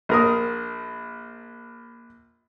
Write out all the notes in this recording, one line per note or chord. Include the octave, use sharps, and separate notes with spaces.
A#1 A#4 D#6